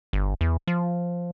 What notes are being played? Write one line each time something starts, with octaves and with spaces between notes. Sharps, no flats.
G1
E2
F3